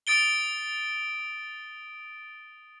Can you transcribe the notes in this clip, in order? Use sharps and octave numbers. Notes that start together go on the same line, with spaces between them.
D#6 A6 D7 G7